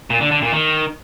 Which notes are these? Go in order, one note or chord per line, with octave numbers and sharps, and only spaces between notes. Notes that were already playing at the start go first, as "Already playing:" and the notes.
A#2
D3
D3
A#2
D#3